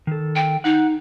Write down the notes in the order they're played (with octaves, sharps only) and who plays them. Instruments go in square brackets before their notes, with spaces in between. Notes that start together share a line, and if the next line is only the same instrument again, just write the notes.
[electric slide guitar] D#3 A4
[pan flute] G5
[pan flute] D#4 [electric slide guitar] F#5